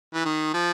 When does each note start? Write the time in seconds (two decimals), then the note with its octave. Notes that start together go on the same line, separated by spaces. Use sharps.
0.14 E3
0.25 D#3
0.54 F3